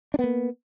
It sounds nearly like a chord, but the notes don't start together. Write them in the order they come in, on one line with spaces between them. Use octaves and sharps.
D4 B3 A#3